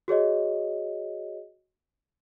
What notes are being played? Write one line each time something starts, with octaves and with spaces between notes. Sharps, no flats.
F#4 G#4 C#5 D#5